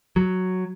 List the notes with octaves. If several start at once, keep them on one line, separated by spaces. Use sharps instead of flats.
F#3